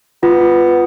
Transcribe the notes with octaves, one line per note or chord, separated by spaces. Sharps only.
B3 F4